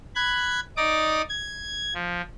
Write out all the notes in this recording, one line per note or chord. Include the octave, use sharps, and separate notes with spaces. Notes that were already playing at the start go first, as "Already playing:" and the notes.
B5 F#6 G#6
D#4 D5 D6 D#6
G#6
F3